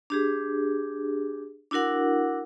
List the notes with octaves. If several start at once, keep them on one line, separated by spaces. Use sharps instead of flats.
D4 G4 G#4
D4 E4 F#4 A#4 F#5